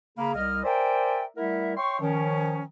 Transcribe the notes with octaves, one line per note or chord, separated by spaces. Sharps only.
C#3 A#3 G#4 F5 A#5 B5
C2 D#5 F6
A#4 C5 D5 E5 G5 G#5
G3 A3 E4 A#4 E5 F#5
C#5 E5 G5 C6 C#6
D#3 F3 C#4